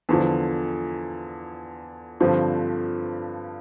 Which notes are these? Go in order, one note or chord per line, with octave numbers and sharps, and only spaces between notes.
E2 D3 F3
G2 D3 F3 C4